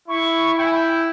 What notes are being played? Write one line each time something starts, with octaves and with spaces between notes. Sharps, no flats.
E4 C#6
E4 G5
G#5
G5